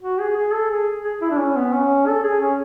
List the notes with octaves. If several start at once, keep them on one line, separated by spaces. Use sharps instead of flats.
F#4
G#4
G#4
A4
G#4
G#4
E4
D4
C#4
B3
C#4
A4
G#4
C#4